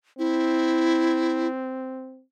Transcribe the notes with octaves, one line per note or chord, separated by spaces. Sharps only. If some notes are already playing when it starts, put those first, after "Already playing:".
C4 E4